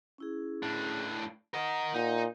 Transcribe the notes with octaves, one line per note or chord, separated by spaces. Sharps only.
C#4 E4 G#4
A2 D4
A#4 D#5 F#5
A#2 D#4